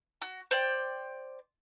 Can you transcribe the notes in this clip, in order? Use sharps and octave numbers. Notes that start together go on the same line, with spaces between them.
F#4
C5 D5 G5